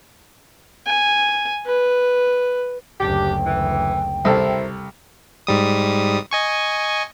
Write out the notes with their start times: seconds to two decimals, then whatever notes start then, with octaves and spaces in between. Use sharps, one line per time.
0.86 G#5
1.66 B4
3.00 F#1 D2 D4 G4 G5
3.46 E3
4.25 C2 E4 A4 A#4 C5
5.47 G#2 G3 D#6
6.31 D#5 G#5 C#6